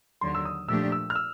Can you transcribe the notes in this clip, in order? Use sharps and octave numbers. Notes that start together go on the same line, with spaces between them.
D#2 D3 F#3 C6
E6
D#6
A#2 F3 A3 D4 G4 E6
E6
F6
E6